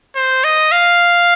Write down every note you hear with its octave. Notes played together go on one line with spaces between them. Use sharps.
C5
D#5
F5